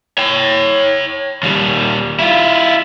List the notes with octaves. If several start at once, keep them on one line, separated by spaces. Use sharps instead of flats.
C#5 G5
D#2 G3
E4 F4